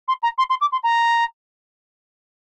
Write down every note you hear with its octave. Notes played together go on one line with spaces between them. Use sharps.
C6
A#5
C6
C6
D6
C6
A#5